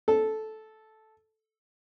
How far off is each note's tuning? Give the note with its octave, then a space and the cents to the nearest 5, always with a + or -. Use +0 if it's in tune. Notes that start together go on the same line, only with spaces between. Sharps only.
A4 -10